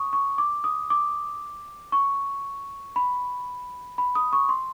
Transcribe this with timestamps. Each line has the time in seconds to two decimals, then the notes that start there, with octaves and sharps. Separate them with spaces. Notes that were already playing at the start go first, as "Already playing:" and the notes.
Already playing: C#6 D#6
0.13 C#6
0.38 D6
0.64 D#6
0.90 D6
1.92 C#6
2.96 B5
3.98 B5
4.15 D#6
4.33 C#6
4.49 C6